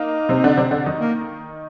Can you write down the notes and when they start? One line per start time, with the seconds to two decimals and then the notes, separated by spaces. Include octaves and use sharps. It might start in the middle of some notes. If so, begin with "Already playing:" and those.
Already playing: A#3 D#4
0.29 C3 C4
0.44 D3 D4
0.57 C3 C4
0.71 D3 D4
0.86 D#3 D#4
1.00 A#3